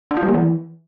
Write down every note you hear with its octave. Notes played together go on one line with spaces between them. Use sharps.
D4
F4
G3
A#3
E3